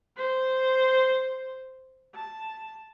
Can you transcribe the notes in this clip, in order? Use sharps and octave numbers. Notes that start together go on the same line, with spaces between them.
C5
A5